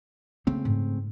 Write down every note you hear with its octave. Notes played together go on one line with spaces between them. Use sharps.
C#3 A3 A#3 C4
G#2